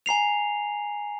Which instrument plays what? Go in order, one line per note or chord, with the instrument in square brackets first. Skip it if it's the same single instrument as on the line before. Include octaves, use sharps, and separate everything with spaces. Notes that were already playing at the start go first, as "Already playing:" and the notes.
[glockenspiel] G#5 A#5 C7 F7